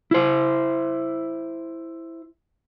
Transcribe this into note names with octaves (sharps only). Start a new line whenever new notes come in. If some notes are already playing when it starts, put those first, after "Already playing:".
E4 C5